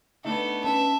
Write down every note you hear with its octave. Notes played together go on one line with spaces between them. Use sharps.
A3 B3 D4 D#4 A4
C#4 B4 E5 A5